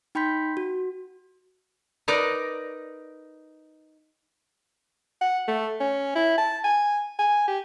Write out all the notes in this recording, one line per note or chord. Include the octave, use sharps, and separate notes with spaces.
D#4 G5 B5 C6 G6 B6
F#4
D#4 A#4 B4 D5
F#5
A3
C#4
E4
A5
G#5
G#5
G4